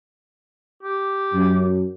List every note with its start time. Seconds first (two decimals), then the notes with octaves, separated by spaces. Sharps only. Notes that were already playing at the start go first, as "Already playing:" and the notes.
0.83 G4
1.33 F#2